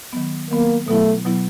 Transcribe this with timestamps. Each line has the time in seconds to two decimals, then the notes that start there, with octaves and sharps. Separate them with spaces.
0.13 D#3 F#3 B3
0.51 D#3 F#3 A#3 B3
0.88 B2 F#3 A3 B3 E4
1.25 B2 F#3 B3 E4